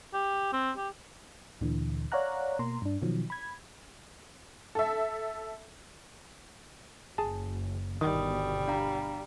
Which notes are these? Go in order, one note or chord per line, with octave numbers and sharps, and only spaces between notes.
G4
C4
G4
D2 A#2 D3 E3
C#5 D5 F5 F#5 A#5 F#6
B2 A#3 A#5 C6
G2 D4
B2 D#3 F3 F#3
B5 G#6
A4 E5
F#1 G#4 A5
G1 B2 D#3 G3 D#6
D4 F5 A#5